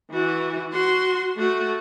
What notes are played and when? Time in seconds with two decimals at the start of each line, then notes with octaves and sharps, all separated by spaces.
0.11 E3 F#4
0.72 F#4 C6
1.37 A3 F#4